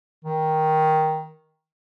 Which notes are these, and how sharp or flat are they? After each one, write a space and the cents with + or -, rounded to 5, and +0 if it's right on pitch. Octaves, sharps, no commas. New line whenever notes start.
D#3 +10